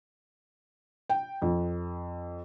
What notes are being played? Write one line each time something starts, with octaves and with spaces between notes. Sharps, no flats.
G5
F2